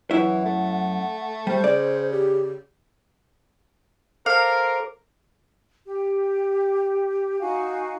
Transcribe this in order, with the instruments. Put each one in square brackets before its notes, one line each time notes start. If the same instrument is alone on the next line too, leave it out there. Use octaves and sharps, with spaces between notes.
[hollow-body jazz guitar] F#2 E4 E5 [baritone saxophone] E3 [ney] F#5
[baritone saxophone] A3
[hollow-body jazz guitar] G3 [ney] C5
[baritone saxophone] C#3 [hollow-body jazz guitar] D5
[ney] G4
[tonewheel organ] A4 C5 D6 [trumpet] A#4 [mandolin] F5
[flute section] G4
D#4 F#4 F5 G#5